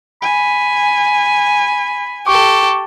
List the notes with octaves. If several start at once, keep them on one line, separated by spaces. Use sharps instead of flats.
G#5 B5
G4 A4 C#6 D6